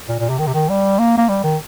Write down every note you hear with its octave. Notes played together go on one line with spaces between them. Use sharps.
A#2
A#2
C3
D#3
C3
D#3
G3
A#3
A#3
G3
D#3